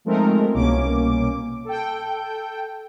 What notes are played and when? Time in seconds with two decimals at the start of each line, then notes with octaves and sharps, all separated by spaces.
0.05 F3 G#3 A3 C4 D#4 A#4
0.54 C2 B2 A#3 C#4 D6
1.65 A4 G5